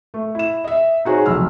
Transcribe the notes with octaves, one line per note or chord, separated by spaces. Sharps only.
A3
E4 E7
D#5 E5
D#4 F#4 G#4 C5 C#5
F1 B1 E6 F6